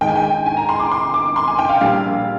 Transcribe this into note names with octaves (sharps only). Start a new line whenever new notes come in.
G#2 D#3 G#3 D#4 G5
G#5
G5
G#5
A#5
C6
D6
C6
D6
C6
G#5
G5
F5
A#1 A#2 G3 F5